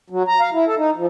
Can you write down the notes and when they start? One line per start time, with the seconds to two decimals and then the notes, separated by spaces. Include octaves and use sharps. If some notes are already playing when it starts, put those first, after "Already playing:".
0.10 F#3
0.28 A#5
0.40 F5
0.53 E4
0.66 A4
0.78 D#4
0.96 F3